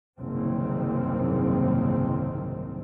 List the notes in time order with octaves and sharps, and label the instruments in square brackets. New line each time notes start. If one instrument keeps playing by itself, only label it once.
[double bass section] F#1 C2 G#2 D#3 C4